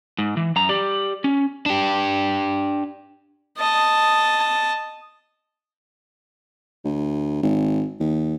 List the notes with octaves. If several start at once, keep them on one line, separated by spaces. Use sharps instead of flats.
G#2
E3
F#2 A#5
G4 D5
C#4
D4 G4
D#5 A5
D2
G#1
D#2